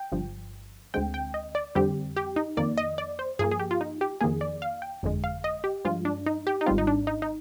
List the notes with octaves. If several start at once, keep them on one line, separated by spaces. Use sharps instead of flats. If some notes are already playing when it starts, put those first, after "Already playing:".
Already playing: G5
G1 G2 F3
D2 D3 G#3 C4 G5
G5
D#5
D5
F2 D3 G3 C4 G4
G4
D#4
F2 D#3 A#3 D5
D#5
D5
C5
G2 F3 A#3 G#4
G#4
G4
F4
D#4
G4
F2 D#3 A#3 G#4
D5
F5
G5
G1 F2 D3 G#3
F5
D#5
G4
G2 F3 G#3 F4
D4
D#4
G4
D#4
G#1 G#2 G3 C4 F4
D#4
D4
D#4
D#4